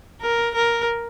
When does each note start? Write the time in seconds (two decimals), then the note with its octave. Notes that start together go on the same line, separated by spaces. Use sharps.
0.21 A#4
0.55 A#4